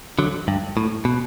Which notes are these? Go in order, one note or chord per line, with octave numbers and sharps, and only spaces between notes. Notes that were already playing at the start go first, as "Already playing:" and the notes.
D3 F#3
G2
A2
B2